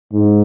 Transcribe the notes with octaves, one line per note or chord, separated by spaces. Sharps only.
G#2